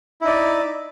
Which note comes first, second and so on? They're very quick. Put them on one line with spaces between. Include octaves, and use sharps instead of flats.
E4 D#4 D5